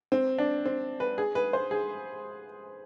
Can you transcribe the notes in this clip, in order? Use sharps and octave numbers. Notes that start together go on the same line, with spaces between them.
C4
D4
C4
B4
G#4
B4
C5
G#4